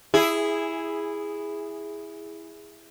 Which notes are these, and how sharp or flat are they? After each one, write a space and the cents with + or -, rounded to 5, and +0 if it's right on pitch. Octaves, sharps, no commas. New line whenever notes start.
E4 +0 G#4 -10